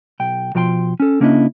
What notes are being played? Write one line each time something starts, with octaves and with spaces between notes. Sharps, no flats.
B1 G5
B2 F3 F4 G5 A5 C6
C#4 A4
C#3 A#3 C#4 D4 E4 D#5